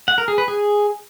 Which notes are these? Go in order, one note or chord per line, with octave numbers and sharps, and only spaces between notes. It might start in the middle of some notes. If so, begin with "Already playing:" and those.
F#5
A#4
G#4
B4
G#4